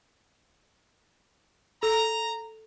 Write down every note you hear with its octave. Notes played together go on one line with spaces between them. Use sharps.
A4 A#5